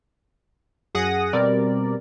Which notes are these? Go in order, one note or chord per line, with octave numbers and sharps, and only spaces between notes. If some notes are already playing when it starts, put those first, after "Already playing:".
F#2 G#4 F#5 D#6 A#6
B2 G3 C4 A#4 D5